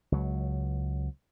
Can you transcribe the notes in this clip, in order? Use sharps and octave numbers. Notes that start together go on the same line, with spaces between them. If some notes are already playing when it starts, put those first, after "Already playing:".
C#2 F#3